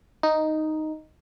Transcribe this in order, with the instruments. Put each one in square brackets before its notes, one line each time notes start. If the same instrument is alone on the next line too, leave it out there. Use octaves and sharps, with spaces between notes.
[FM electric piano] D#4